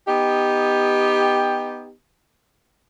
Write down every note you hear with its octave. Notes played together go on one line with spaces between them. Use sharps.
B3 D#4 G4